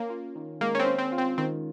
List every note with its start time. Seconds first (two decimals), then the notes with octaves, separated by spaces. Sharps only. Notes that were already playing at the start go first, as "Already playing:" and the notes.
Already playing: A#3 C#4
0.10 F4
0.35 D#3
0.61 G#3 A#3
0.75 C#4
0.80 C4
0.86 C#4
0.98 C4
1.12 F4
1.18 C4
1.38 D#3 C4